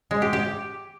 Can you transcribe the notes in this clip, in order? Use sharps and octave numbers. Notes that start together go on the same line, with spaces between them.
G#3
G4
G4